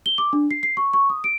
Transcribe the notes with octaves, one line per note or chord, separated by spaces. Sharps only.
G7
D6
D4
C7
C7
C#6
C#6
D#6
D7